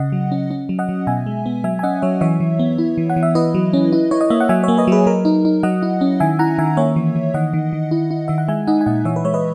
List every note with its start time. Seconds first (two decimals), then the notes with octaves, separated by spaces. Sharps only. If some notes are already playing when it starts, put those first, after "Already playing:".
Already playing: C#3 D#5 F#5
0.12 F#3
0.32 C#4
0.50 C#4
0.69 F#3
0.79 D#5 F#5
0.89 F#3
1.07 B2 E5 G#5
1.26 G#3
1.46 B3
1.64 F#3 E5 G#5
1.79 G#5
1.83 C#4 D#5 F#5
2.02 F#3 C#5 E5
2.21 E3 C#5 E5
2.40 E3
2.59 B3
2.78 E4
2.98 E3
3.10 F#5
3.16 E3
3.23 E5
3.35 E4 B4 D#5
3.55 F#3
3.73 C#4
3.92 E4
4.11 E4 C#5
4.21 D#5
4.30 A#3 E5
4.40 F#5
4.49 F#3 E5 G#5
4.63 A#3 C#5 E5
4.77 B4 D#5
4.87 F#3 G#4 B4
5.06 F#3 A#4
5.25 D#4
5.45 D#4
5.63 F#3 D#5 F#5
5.83 E4
6.01 C#4
6.20 D#3 E5 G#5
6.39 E4 F#5 A#5
6.58 D#3 E5 G#5
6.77 A#3 C#5 E5
6.96 E3
7.15 E3
7.34 D#3 D#5 F#5
7.53 D#3
7.73 D#3
7.91 E4
8.11 E4
8.28 D#3 E5
8.38 F#5
8.48 G#3 E5 G#5
8.67 D#4 D#5 F#5
8.81 G#5
8.86 A#2 D#5 F#5
9.05 E3 C#5 E5
9.16 B4
9.25 G#3 C#5
9.34 B4 D#5